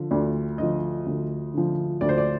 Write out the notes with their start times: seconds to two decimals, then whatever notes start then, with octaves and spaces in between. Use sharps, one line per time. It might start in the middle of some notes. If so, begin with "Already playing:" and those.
Already playing: D3 F3
0.11 D2 D5
0.58 D3 F3 D#5
1.06 D2
1.54 D3 F3
2.01 D2 D5
2.09 C5
2.18 D5